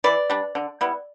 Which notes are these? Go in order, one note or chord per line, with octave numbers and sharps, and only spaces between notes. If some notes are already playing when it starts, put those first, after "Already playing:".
E3 B4 D5
G3 D4
D3
G3 B3 E4